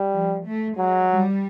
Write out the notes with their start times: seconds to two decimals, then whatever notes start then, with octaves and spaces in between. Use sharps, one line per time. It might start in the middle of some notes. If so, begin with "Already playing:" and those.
Already playing: G3
0.13 F3
0.45 A3
0.78 F#3 G#3
1.10 G3